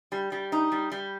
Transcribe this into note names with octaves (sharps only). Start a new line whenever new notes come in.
G3
G3
D#4
G3
G3